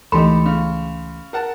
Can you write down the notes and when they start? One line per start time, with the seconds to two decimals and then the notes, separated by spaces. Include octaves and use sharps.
0.12 C#2 E3 A3 D#4 G4 A4 B5 C6
0.46 C#3
1.33 A#4 F#5 A5